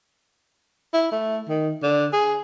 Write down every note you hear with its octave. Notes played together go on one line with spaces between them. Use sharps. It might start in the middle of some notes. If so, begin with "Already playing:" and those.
E4
A3
D#3
D3
G#4